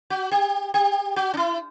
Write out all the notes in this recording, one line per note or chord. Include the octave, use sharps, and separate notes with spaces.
F#4
G4
G4
F#4
D4
E4